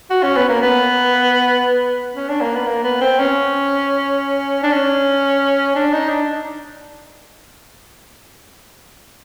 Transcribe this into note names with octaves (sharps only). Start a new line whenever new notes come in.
F#4
C#4
B3
A#3
B3
C#4
D4
A#3
B3
A#3
B3
C4
C#4
D4
C#4
D4
D#4
D4